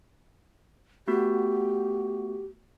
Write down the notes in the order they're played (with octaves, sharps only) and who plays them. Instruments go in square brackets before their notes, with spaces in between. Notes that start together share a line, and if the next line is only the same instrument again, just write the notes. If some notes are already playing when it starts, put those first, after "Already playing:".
[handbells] A3 B3 F#4 [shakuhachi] G4